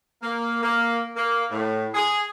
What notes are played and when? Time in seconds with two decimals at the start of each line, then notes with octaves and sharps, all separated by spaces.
0.23 A#3
0.63 A#3
1.16 A#3
1.51 A2
1.95 G#4